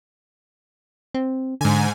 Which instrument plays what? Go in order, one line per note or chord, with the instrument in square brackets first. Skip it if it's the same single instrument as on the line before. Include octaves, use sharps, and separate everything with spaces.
[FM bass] C4
[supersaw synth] G#2 G#5 [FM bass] D3